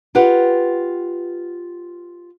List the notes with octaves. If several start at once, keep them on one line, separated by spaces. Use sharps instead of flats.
F4 G4 B4 F#5